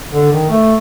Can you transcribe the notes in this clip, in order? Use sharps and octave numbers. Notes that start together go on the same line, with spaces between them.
D3
D#3
A3